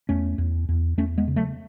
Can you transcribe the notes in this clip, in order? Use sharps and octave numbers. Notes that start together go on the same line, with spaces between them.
E2 A3 C#4
E2
E2
E2 A3 C#4
G#3 B3
C#3
F#3 A3